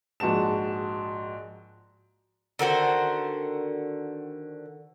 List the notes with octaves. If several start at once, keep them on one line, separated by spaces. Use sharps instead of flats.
A#1 G#2 F#4 A5 E7
D3 D#3 F#4 C5